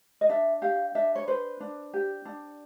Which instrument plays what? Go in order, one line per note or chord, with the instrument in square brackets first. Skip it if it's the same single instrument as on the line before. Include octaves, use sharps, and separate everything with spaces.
[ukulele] D#5
D4 E5
G4 F5
D4 E5
C#5
B4 C5
D4
G4
D4